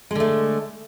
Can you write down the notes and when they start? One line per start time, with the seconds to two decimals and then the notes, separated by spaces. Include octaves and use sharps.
0.11 G#3
0.15 D3
0.20 A3